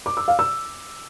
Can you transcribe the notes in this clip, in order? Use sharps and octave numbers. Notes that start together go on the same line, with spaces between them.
D6
E6
F5
E6